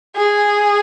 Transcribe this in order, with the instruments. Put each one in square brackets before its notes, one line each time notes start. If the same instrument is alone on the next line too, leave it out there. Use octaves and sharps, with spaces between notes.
[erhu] G#4